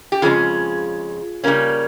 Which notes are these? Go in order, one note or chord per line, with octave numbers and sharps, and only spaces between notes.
G4
F2 C#3 G#3 C#4 F4 G#4
C#3 G3 A#3 C#4